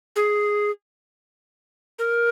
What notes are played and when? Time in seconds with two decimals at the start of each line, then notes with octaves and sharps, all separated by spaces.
0.16 G#4
1.99 A#4